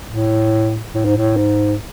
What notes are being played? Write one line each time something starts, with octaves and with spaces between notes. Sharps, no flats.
A2
A2
G#2
A2
G#2